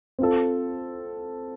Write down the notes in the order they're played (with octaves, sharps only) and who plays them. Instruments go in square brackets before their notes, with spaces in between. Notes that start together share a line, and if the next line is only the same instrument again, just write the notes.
[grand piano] C4 F4 A4